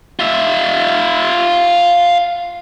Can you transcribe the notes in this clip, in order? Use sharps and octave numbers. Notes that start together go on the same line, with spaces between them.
F4 E5